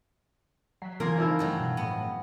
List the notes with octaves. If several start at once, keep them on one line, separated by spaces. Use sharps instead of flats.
F#3 F#6 B6 C7
C#3 E3 A#3 C4 F4 G#4 A#4
F3 D#4 E4 A#4
G2 F#3 A3
B2
A2 B3